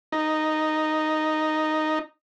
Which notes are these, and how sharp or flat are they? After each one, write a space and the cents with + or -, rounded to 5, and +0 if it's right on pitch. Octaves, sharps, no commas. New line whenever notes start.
D#4 -5